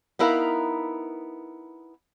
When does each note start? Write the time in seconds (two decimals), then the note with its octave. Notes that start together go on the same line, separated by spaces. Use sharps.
0.19 B3 D#4 E4 A#4 B4 F5